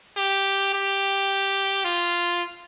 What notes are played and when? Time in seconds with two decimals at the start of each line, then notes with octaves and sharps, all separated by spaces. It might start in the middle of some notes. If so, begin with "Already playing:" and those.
0.17 G4
0.73 G4
1.85 F4